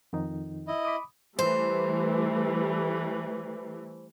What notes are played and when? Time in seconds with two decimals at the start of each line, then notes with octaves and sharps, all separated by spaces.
0.13 F2 D#3 D#4
0.68 E4 D#5
0.85 B5 D6 D#6
1.39 E3 G3 A3 C5